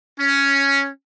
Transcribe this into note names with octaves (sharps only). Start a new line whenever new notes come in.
C#4